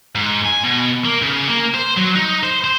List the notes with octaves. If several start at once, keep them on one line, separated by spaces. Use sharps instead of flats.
G#2
G#5
B2
A#3
C#3
A#3
C5
F#3
D#4
C5
C5